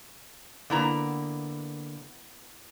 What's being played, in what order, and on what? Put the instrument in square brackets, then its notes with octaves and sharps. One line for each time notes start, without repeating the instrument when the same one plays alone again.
[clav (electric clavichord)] D3 A#3 [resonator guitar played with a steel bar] B3 E4 A#5